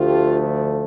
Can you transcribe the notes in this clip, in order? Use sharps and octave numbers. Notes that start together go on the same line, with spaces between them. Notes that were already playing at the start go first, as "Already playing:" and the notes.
Already playing: D2 D3 F3 A3 F4 G4